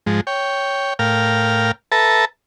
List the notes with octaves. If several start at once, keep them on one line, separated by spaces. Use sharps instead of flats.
G#2 F3 G#3
C#5 G5
A2 A#4 F5 G5 F6
A4 B4 E5 A5 A#5